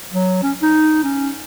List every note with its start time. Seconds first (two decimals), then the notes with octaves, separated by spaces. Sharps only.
0.12 F#3
0.43 C#4
0.62 D#4
1.03 C#4